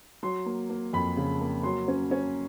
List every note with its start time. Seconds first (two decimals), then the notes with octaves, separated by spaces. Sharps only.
0.23 F#3 C6
0.46 A#3
0.70 A#3
0.93 F2 B5
1.17 C#3
1.41 A#3
1.63 F#3 C6
1.88 C#4
2.11 C#4